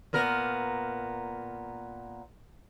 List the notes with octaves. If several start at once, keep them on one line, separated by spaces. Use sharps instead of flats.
A#2 B3 A#4